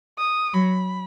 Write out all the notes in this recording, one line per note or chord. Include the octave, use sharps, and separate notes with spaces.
D#6
F#3 B5